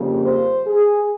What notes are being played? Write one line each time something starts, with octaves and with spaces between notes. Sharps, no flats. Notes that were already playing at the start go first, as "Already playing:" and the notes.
Already playing: F2 C#3 G3 A#3
C5
G#4